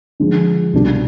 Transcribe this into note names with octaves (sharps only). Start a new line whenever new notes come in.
D3 F3 G#3
C2 B2 G3 D4 G4